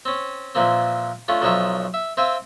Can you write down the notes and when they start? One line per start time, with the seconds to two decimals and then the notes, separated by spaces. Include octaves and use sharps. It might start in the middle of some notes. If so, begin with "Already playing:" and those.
0.05 C4 C#4
0.55 A#2 E3 F3 A#3 C4
1.28 A3 C#4 D4 F4
1.42 B1 F3 D4 D#4 C#5 E5
1.94 E5
2.17 C4 C5 E5 F5 G5 G#5